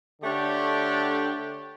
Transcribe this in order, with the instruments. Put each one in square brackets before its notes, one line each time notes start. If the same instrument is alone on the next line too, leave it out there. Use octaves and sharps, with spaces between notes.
[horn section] D3 A3 D4 G4 C#5